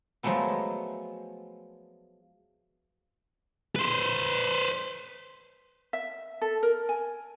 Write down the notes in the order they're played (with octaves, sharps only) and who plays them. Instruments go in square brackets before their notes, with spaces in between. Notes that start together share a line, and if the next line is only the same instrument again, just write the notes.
[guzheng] F3 F#3 G#3 A3 B3
[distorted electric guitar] B4 C5
[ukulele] E5
A4
A#4
G#5